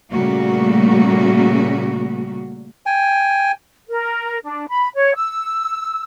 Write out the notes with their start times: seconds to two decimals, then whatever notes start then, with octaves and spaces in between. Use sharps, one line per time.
0.12 A#2 C#3 G3 A3 A#3 F#4
2.86 G5 G#5
3.88 A#4
4.44 D4
4.68 B5
4.95 C#5
5.15 E6